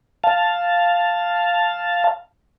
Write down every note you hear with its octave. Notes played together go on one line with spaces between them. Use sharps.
F5 A5